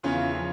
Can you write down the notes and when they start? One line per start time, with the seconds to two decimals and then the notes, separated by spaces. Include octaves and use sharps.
0.03 E2 C#3 E3 C#4 F4
0.33 C#3 F3